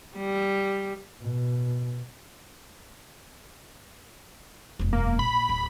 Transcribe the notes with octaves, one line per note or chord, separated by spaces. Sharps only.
G3
B2
E1 F#2
A#3
A#1 B5
D1